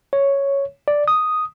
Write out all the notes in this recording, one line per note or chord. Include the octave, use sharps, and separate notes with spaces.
C#5
D5
D#6